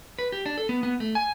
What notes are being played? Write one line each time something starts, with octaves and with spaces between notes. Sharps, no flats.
B4
G4
D4
A4
B3
B3
A3
G#5